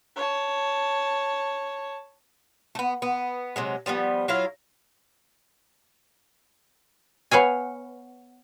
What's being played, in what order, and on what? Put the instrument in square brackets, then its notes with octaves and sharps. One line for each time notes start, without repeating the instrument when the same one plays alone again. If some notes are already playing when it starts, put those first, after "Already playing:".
[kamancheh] C#5 A5
[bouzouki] A3 B3
B3
C3 F#3 G#3
F3 G3 G#3 B3
F#3 E4 F4 F5
[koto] B3 C#5 F5 G#5